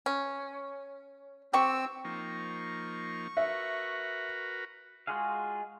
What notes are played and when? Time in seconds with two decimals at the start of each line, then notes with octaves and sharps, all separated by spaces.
0.06 C#4
1.53 C4 G4 G5 C#6 E6
2.05 F3 A#3 D#4 C#6
3.37 F#4 A#4 B4 E5
5.07 G#3 F4 F#4 G#4 F5